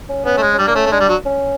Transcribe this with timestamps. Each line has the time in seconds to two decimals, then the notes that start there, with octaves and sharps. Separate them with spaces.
0.09 C#4
0.25 B3 C#4
0.37 A3
0.42 G#3
0.54 C#4
0.59 G3 D4
0.67 A#3
0.75 A3 C#4
0.86 A3
0.92 G#3 D4
1.00 G3
1.09 F#3
1.25 C#4